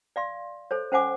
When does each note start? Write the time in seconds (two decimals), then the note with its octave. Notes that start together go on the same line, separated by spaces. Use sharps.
0.16 D5 F5 C6
0.71 A4 C5 C#5
0.92 C#4 C5 F#5 G#5 D6